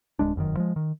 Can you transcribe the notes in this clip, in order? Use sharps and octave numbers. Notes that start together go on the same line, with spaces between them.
D1 G2 G#3 D4
F1 F#2 D3 D#3
F3 G#3
D#3